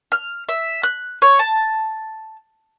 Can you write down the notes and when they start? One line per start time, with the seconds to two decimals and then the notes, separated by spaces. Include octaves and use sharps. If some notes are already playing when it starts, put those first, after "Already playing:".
0.12 F6
0.49 E5
0.83 F#6
1.22 C#5
1.39 A5